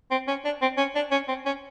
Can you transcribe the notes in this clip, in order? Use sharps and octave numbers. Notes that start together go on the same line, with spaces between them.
C4
C#4
D4
C4
C#4
D4
C#4
C4
C#4